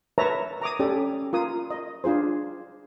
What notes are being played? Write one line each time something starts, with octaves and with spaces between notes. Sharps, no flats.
A#4 B4 C#5 E5 A5 A#5
A#5 D6 D#6
C#4 G4 A4 D5
F4 A#4 D#6
D#5
D4 F4 G#4 C5